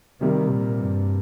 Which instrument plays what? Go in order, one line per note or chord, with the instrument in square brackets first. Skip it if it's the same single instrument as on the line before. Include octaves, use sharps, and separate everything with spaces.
[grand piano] C3 G3 A#3 [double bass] D#3
[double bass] A#2
G2